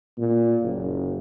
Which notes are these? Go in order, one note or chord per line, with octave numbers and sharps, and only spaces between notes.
A#2
F#1